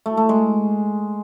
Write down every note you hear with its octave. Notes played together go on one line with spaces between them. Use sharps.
A3
A3
G#3